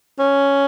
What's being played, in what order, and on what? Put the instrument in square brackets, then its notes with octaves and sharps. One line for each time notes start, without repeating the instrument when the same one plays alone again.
[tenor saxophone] C#4